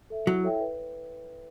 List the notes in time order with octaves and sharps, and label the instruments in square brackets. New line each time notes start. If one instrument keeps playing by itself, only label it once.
[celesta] A4 E5
[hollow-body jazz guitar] F#3 [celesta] E4
[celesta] A4 C#5 E5 G5
B4